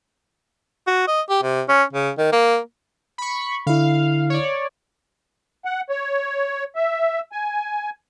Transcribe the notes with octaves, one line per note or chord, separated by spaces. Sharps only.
F#4
D#5
G4
C3
C#4
C#3
D#3
A#3
B5 C#6
D3 E4 F5
C#5 D5
F#5
C#5
E5
G#5